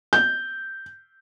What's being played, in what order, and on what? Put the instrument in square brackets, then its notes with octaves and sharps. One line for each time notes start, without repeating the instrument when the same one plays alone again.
[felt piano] G6